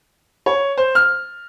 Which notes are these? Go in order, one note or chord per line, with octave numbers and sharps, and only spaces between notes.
C#5
C5
F6